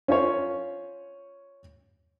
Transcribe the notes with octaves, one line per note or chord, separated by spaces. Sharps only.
C#4 F4 C5 C#5